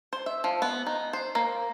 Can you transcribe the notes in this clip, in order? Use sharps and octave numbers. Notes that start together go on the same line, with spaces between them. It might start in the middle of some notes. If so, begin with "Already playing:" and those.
C5
E5
F3
B3
D#4
C5
A#3